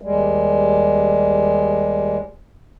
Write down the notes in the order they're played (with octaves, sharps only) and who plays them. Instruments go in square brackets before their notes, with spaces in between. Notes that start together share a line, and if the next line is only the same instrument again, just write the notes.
[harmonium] D#2 G3 G#3